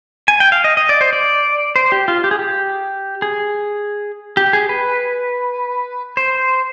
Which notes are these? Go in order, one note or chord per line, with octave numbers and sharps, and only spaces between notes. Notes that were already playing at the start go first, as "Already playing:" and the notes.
G#5
G5
F5
D#5
D#5
D5
C5
D5
C5
G4
F4
G4
G#4
G4
G#4
G4
G#4
B4
C5